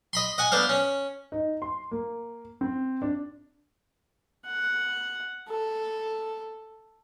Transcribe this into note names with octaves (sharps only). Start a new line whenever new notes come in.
D#5 B5 C6
D#5 F#5 G#5
B3 D4 C5 F5
C#4
D#4
C6
A#3
C4
D4
F#5
A4